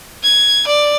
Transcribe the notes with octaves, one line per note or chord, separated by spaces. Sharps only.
G#6
D5